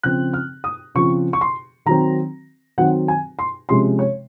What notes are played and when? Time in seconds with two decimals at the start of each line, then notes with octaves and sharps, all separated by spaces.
0.03 C#3 F3 C4 F#6
0.34 F6
0.64 D#6
0.95 C#3 F3 C4 C#6
1.33 C#6
1.41 C6
1.86 D#3 F#3 C4 A#5
2.78 D#3 F#3 C4 F#5
3.08 G#5
3.39 C6
3.69 C3 F3 G#3 C#4 C6
3.99 C#5